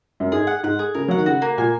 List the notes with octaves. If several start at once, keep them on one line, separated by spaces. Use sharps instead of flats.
F#2
G#2 G#4
F#5
G#2 F#5
G#4
C#3 A#4
F#3 F#5
D#3
C#3 F#4
A#3
A#2 G#5